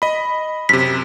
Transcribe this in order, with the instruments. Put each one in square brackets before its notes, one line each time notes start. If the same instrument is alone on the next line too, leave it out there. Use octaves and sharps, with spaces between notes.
[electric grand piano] D#5 B5
[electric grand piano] F#2 C3 [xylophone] B6